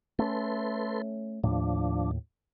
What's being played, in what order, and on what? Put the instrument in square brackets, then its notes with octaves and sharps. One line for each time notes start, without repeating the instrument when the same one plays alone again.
[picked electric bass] A3 C#4 [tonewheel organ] A4 B4 C6
[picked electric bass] D#2 A2 [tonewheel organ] F3 D4